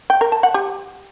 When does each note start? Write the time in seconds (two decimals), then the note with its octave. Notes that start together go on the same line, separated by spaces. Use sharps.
0.10 G5
0.21 A#4
0.32 A5
0.43 F#5
0.54 G4